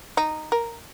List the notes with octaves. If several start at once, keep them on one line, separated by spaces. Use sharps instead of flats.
D#4
A#4